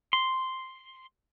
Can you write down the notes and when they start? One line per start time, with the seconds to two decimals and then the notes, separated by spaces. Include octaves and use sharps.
0.13 C6